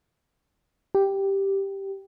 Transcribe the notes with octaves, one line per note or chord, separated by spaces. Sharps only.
G4